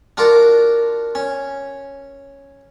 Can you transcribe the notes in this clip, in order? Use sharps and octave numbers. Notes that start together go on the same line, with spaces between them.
D4 F4 F#4 A#4
C#4